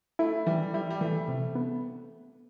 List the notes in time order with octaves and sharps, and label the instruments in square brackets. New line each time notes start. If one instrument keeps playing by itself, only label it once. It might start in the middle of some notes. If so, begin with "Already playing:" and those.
[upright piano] A3 [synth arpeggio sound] E4
[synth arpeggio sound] E3 [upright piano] G3
[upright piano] G3 [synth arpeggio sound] E4
[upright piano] G3
[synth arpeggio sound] E3 [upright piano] A3
[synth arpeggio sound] C3
B3